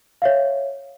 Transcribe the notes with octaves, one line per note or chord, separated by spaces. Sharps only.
C#5 E5 F5